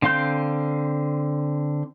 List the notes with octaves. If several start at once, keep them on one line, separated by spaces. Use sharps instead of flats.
D3 C4 F5 C6 G6